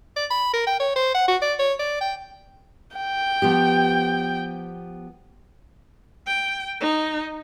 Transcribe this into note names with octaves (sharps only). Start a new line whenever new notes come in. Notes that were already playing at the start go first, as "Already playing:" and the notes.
D5
B5
A#4
G5
C#5
C5
F#5
F#4
D5
C#5
D5
G5
G5
F3 B3 G4
G5
D#4